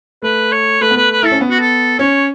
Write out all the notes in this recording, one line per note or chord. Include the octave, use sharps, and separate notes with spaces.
A3 B4
C#5
A3 B4
B3
A3 B4
B4
E4 A4
C#4
B3
F#4
A4
C#4 C#5